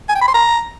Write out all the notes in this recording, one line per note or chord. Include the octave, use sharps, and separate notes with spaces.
G#5
G5
B5
C6
A#5